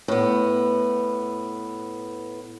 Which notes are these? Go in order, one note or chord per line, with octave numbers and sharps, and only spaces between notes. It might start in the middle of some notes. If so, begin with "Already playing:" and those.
A2 B3